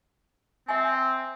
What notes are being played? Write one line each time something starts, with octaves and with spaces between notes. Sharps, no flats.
C4 E5 G#5